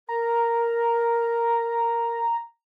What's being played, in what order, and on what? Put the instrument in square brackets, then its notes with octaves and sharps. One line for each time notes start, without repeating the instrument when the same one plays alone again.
[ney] A#4 [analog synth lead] A#5